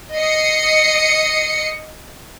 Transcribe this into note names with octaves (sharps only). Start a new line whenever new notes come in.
D#5 D#6 C7 C#7